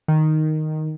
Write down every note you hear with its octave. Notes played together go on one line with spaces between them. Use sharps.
D#3